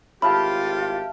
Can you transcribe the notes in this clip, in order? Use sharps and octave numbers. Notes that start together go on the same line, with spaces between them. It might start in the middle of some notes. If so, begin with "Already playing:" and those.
G#1 A2 F4 G4 E5 F5 A5 B5